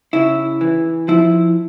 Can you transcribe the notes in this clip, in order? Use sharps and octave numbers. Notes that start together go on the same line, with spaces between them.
C#3 E4
E3
F3 E4